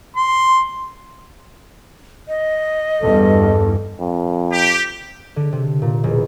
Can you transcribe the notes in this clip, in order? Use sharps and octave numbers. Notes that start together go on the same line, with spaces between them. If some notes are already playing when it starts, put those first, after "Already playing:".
C6
D#5
E2 G2 A4
F2
G4
D3
C3
A#2
E1